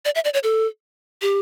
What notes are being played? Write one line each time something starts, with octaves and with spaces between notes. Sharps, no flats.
D5
E5
D5
C#5
A4
G4